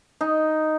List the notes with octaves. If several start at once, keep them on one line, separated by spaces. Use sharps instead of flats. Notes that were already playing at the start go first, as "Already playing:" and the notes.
D#4